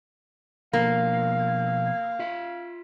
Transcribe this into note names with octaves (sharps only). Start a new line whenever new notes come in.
B2 F3 A#3 F5
F4 E5